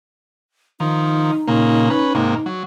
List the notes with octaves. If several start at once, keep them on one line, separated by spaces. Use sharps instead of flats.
D#3 F3 D#4
A#2 C#3 A#3
C#4 B4
G#2 C3 A#3
F#3